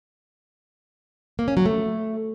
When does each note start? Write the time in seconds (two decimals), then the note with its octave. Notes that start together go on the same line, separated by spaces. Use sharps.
1.39 A#3
1.48 C#4
1.57 F#3
1.66 A3